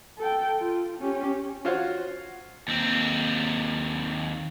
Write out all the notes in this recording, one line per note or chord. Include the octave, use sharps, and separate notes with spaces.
A4 G5
F4
C#4 G4
F4 F#4 C5 C#5 F5 F#5
D#2 C4